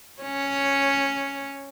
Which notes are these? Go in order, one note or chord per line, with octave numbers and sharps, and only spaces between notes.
C#4 C#5